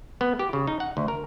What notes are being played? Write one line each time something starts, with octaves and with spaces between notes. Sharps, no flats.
B3
G4
C#3
D#4
F#5
D2
A#4